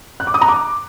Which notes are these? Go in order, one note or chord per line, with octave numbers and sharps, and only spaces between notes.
F#6
D6
D#6
A#5
D6